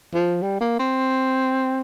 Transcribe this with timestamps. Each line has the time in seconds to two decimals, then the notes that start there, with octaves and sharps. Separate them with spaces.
0.14 F3
0.42 G3
0.61 A#3
0.79 C4